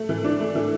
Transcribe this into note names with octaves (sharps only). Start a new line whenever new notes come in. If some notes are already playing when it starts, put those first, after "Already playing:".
Already playing: A3
E3
D4
A3
E3